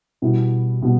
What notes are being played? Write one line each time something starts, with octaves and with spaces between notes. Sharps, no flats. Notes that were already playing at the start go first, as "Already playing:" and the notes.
B2 G3 B3 E4
B2 G3 B3